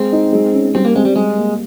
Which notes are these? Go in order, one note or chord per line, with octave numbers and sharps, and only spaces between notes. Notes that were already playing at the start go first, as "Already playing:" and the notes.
Already playing: G#3 C4
D#4
G#3
C#4
G3 C4
A#3
G#3 C4
G3
G3 G#3
A#3